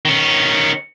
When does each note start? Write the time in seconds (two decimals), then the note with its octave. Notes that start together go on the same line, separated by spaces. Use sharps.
0.05 D#3 C#4